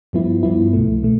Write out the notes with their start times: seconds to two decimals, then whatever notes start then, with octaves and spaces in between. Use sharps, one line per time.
0.13 G2 F3 B3 E4
0.43 G2 F3 B3 E4
0.73 C2 B2 A3
1.03 B2 A3